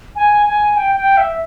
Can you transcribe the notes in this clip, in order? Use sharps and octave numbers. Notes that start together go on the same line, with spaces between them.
G#5
G#5
G5
G5
E5